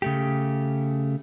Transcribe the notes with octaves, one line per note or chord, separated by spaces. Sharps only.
C#3 A3 G4